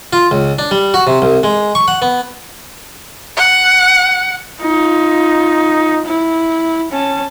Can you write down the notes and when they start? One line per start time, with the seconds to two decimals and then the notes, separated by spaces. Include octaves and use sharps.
0.13 F4
0.31 C#2
0.59 D4
0.71 G3
0.94 F#4
1.07 C3
1.22 C2
1.43 G#3
1.75 C#6
1.88 F#5
2.02 B3
3.37 F#5
4.61 D#4 F4
6.06 E4
6.91 C#4 A5